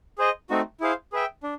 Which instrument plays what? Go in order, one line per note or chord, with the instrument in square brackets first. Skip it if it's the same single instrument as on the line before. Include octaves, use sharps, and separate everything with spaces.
[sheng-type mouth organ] G#4 C5 D#5
A3 C4 D#4 F#4
E4 G#4 C5 F5
G#4 B4 E5 G5
D4